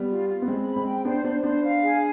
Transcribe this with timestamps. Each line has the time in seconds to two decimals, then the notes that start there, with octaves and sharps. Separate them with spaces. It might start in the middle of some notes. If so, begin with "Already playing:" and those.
Already playing: G3 B3
0.09 F4
0.28 F4
0.42 B3
0.47 G#3 C4 B5
0.67 B5
0.76 G#3 C4
0.86 G5
1.05 B3 D4 C5
1.24 B3 D4 C5
1.43 B3 D4 C5
1.63 F5
1.82 G#4